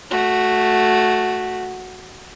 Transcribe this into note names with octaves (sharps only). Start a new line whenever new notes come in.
A3 F#4